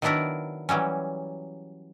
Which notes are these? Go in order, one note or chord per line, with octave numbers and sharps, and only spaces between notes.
D#3 F#3 B3 D4 E4 A#4
E3 F#3 G3 C#4